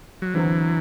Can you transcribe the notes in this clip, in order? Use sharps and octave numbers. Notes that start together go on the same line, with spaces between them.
F#3
E2 D3 E3 F#3 C4